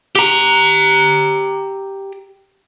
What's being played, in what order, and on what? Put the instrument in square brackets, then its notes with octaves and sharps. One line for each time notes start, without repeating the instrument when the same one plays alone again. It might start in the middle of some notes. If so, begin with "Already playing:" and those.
[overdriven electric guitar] G4 A#5